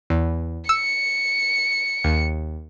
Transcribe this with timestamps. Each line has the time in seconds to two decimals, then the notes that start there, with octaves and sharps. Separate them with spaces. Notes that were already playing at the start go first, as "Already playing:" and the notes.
0.10 E2
0.69 E6 C#7
2.04 D#2